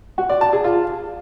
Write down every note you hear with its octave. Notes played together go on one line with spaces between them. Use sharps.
F#4
D5
A5
G#4
F4